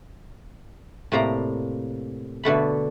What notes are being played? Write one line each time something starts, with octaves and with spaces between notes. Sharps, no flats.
A2 C3 A#3 D5 A#5
B2 D3 A3 B5